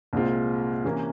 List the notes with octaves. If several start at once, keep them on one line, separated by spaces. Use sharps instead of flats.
C2 A#2 G#3 C4 F4
C3 E3 A#3 C#4